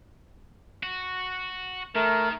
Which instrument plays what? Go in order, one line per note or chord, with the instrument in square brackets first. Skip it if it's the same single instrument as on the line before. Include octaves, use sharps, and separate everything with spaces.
[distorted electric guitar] F#4
[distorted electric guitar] D#3 [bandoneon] A3 A#4